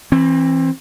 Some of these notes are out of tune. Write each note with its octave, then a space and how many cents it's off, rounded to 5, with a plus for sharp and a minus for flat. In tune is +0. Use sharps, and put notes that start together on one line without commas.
E3 +0 C4 +25